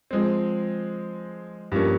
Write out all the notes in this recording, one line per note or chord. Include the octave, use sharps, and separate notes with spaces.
F3 G#3 C4
G2 F3 A#3 C#4